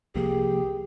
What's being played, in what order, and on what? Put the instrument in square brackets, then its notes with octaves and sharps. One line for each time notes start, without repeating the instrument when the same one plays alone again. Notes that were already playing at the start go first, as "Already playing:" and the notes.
[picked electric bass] C2 F3 A#3 [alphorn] G4 [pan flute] G#4